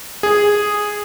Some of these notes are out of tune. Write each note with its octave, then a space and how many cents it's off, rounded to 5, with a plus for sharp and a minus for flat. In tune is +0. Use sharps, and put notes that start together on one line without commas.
G#4 -5